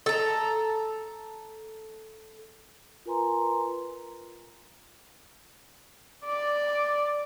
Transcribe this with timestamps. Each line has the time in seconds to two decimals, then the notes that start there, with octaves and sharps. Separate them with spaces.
0.06 A4 A#5
3.05 F4 A#4 B4 G#5 A#5 C6
6.25 D5